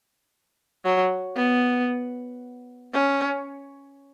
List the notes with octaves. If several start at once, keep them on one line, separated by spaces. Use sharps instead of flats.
F#3
B3
C#4